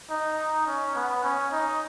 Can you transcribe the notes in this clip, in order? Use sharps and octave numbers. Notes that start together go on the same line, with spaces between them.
D#4
C#4
B3
C#4
D#4